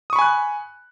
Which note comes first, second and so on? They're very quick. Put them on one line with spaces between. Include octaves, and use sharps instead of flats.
D#6 C#6 B5 G#5 F#6